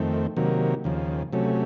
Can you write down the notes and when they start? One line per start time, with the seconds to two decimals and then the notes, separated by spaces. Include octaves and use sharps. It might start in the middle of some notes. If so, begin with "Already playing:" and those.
Already playing: F2 D#3 A3 C4
0.36 C3 D#3 F#3 A#3
0.84 D#2 C#3 F3
1.33 C3 F#3 A3 C#4